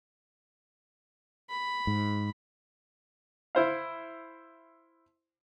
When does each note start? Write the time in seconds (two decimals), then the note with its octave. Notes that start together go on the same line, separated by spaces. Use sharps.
1.50 B5
1.87 G#2
3.55 E4 C5 F5